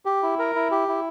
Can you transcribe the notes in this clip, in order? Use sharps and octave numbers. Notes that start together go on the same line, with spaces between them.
G4
E4
A#4
E4
G4
E4